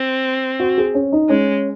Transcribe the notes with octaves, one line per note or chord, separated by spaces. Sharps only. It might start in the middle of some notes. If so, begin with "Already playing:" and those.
Already playing: C4
F#4
G#4
C#4
D#4
G#3 C#4